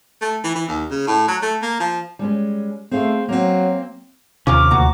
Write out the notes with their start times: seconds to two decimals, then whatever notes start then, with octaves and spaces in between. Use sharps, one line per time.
0.21 A3
0.44 E3
0.55 E3
0.68 D#2
0.90 C#3
1.07 A2
1.28 F#3
1.42 A3
1.62 A#3
1.80 F3
2.19 G3 G#3 C#4
2.91 A3 C4 G#4 F5
3.28 F#3 A#3 C4
4.47 D#2 C3 C#4 F4 A#4 D6
4.71 D2 A#2 F#4 A#5